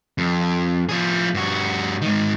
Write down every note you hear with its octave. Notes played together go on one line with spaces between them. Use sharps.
F2
F3 G#4
G2 F#4
G#2 D#3